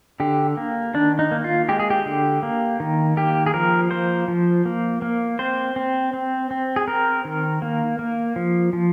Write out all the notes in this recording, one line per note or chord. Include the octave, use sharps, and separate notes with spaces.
D3 G4
A#3
D#3 D4
D#4
A#3
F4
G#3 G4
G#4
G4
D3
A#3
D#3
A#3 G4
G#4
F3 A#4
A#3 C5
F3
A#3
A#3
C4 C5
C4
C4
C4
G#4
C4 A#4
D#3
A#3
A#3
F3
F3